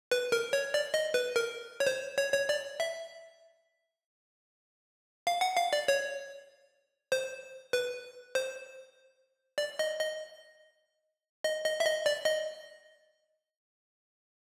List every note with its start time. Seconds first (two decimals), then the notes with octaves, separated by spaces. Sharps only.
0.11 B4
0.32 A#4
0.53 C#5
0.74 D5
0.94 D#5
1.14 B4
1.36 A#4
1.80 C#5
1.87 C5
2.18 C#5
2.34 C#5
2.49 D5
2.80 E5
5.27 F5
5.41 F#5
5.57 F5
5.73 D5
5.88 C#5
7.12 C5
7.73 B4
8.35 C5
9.58 D5
9.79 D#5
10.00 D#5
11.44 D#5
11.65 D#5
11.80 E5
11.85 D#5
12.06 D5
12.25 D#5